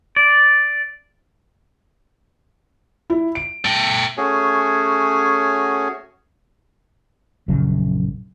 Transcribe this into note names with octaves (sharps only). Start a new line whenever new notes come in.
D5
E4
D7
A3 G5
A3 C#4 F#4 G#4 C#5 G#5
A#1 F#2 C#3 F#3